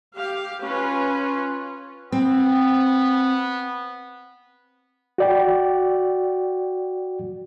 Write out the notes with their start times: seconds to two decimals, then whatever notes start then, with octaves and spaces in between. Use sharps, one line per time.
0.16 G4 F5
0.63 C#4 F4 B4
2.12 B3 C4
5.18 F#4 D5 G5